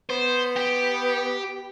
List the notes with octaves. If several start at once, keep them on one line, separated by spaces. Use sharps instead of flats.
B3 C5
G4